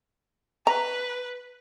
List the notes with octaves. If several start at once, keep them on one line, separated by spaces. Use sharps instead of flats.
B4 A#5